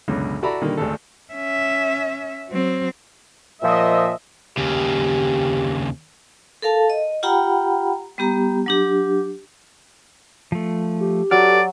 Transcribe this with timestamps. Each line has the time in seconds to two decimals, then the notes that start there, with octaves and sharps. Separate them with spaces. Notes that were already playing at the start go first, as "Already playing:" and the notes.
0.08 C#2 F#2 B2 D3
0.42 E4 F#4 A4 D5 A#5 B5
0.61 A#2 D3 D#3 G3 A#3
0.77 G#1 D2 A4
1.34 C#4 E5
2.49 F#3 C4
3.62 A#2 F3 D#5 E5
4.57 D#2 C#3 G4
6.62 A4 A#4 F5 A5
6.90 D#5
7.23 F4 G4 F#5 G5 A#5 B5
8.18 G3 B3 G4 A#5
8.66 F#3 D4 G4
10.52 F3 A3
11.01 G4
11.31 F#3 A4 B4 D5 F6